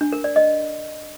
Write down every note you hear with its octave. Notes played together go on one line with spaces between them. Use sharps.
D4
A#4
D5
D#5